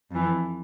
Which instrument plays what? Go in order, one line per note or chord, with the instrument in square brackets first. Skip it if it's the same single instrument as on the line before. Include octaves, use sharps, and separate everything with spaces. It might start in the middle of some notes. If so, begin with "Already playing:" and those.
[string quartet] F2 E3